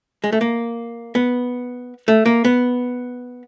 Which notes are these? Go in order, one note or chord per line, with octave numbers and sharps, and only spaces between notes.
G#3
A3
A#3
B3
A3
A#3
B3